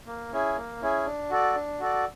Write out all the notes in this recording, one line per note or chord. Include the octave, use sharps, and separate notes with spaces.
A#3
C#4 E4 G#4
A#3
C#4 E4 G#4
D4
F#4 A4 D5
D4
F#4 A4 D5